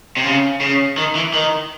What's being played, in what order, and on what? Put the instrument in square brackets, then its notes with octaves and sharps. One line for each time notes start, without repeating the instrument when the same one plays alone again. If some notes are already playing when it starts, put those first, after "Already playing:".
[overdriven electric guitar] C3
C#3
C#3
D#3
E3
D#3